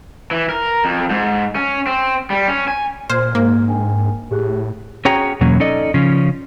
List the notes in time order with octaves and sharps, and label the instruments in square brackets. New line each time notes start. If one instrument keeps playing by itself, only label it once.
[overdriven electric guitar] E3
A#4
F2
G#2
C#4
C4
G3
C#4
G#5
[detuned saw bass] A#2 [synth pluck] C5 [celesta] F6 G#6
[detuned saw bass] G#2 [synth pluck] A#3
[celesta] D4 G5 G#5
[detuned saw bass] A2 [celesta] G4 G#4 F#6
[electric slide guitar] C#4 F#4 G#4 C#5 G5 A#5
E2 B2 F#3 A#3 C#4
C#4 D#4 A4 D5 D#5
C#3 F3 C#4